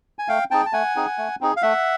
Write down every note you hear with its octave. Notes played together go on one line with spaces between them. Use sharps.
G#5
A3 F5 G5
C4 D#4 G#4 G5 A5
A5
A3 F#5 G#5
C4 D#4 G#4
A3
C4 D#4 G#4
F5
A3 E5 F#5